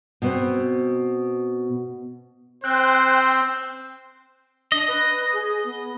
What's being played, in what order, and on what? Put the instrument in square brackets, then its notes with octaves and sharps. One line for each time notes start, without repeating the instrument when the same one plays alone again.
[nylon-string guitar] B2 B3 C4
[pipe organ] C4 [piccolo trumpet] C5 [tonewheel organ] G5 F#6
[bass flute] D4 [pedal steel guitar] D#5
[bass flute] B4
G#4
B3